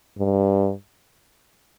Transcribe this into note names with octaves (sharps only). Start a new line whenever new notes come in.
G2